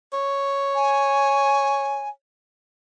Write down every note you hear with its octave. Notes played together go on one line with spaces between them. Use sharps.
C#5
G#5